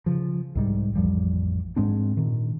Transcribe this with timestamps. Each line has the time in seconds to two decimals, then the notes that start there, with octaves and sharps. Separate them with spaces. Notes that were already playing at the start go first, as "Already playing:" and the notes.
0.06 C#3 F3
0.55 C2 G#2 G3
0.95 A1 F2 F3 G3
1.76 G#2 G#3 C4 D4
2.17 A#2 D#3